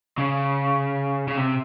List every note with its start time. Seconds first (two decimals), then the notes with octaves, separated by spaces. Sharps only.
0.18 C#3
1.28 C#3
1.38 C3